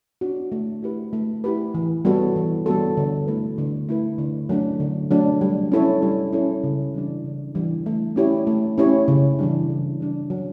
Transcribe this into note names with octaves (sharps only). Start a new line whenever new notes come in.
D4 F#4
A3
E4 G4 B4
A3
E4 G4 B4
E3
G3 B3 F#4 A4
E3
G3 B3 F#4 A4
D3
A3 E4 B4
D3
A3 E4 B4
D3
F#3 A3 D4
D3
F#3 A3 D4
G3
C#4 E4 A4 C#5
G3
C#4 E4 A4 C#5
C#3
E3 G3 D4
C#3
E3 G3 D4
A3
C#4 E4 G4 C#5
A3
C#4 E4 G4 C#5
C#3
E3 G3 D4
C#3
E3 G3 D4
F#3